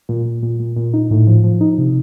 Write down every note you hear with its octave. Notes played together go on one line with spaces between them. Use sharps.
A#2
A#2
A#2
A#2
A#2
D#4
A2
F3
F3
D#4
C3